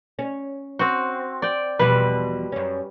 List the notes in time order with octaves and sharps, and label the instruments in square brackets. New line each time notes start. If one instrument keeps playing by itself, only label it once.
[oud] C#4
[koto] C4 F#4
D5 G5
[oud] E2 B2 F3 [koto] G3 B4
[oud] F#2 C#4